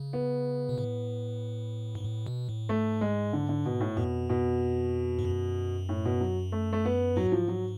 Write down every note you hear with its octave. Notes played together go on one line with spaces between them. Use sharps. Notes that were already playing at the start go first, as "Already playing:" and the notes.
Already playing: C#3
B3
B2
A2
G#2
A2
B2
A2
G#2 A3
G#3
D3
D3
B2
A2
F2 B2
B2
G#2
F#2
A2
B2
F#3
A3
A3
B3
G#2 F#3
F3
F#3